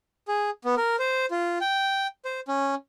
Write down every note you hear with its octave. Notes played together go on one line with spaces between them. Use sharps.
G#4
B3
A#4
C5
F4
G5
C5
C#4